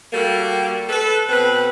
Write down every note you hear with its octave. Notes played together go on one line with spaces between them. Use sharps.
G3 A#3 F#4 G4 A4
A4 B4
B2 C4 B4